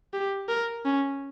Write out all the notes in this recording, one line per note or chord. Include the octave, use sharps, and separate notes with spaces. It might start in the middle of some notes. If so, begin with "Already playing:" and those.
G4
A#4
C#4